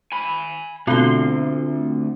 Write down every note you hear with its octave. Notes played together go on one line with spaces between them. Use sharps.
G#5 B5
D2 B2 D3 A3 C4 F4 C6 D6